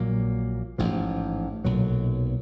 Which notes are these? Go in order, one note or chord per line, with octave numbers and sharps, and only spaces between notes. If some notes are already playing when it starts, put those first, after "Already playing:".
Already playing: A#1 A#2 F#3 A#3
A1 G#2 F3
B1 A#2 F#3